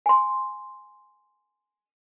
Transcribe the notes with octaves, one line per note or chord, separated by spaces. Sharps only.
G#5 C6